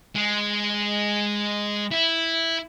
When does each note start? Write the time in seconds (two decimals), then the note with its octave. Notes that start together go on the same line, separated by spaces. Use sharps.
0.15 G#3
1.92 E4